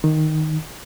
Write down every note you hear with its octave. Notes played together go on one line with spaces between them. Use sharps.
D#3